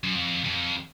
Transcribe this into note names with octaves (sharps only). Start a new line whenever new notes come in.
F#2
F2
F2